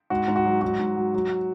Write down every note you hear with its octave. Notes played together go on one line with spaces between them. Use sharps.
G#2 F#4
G#2
F#4
F#3
G#2 F#4
G#2
F#3
F#3